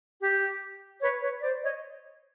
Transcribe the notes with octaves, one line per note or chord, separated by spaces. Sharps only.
G4
B4 C#5
B4 C#5
C5 D5
C#5 D#5